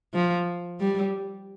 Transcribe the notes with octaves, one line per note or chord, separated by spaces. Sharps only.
F3
G3